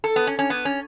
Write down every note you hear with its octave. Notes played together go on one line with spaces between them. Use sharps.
A4
B3
C#4
C#4
B3
C#4